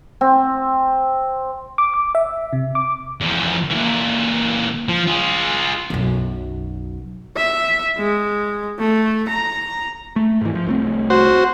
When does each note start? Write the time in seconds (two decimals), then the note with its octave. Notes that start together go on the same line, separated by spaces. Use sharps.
0.21 C4
1.78 D6
1.94 D6
2.15 E5
2.53 C3
2.75 D6
3.21 E2 F3
3.70 A#2 E3
4.88 F3
5.08 F4 G#4
5.90 B1 F#2
7.37 E5
7.97 G#3
8.79 A3
9.28 A#5
10.16 A3
10.41 G#2 E3
10.55 F3
10.66 C2 A3 C4
11.10 F#4 C5